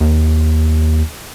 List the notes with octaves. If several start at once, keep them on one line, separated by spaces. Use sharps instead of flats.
D#2